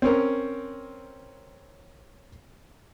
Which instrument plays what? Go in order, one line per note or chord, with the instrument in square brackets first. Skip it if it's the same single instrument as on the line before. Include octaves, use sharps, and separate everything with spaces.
[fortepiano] C4 C#4 A#4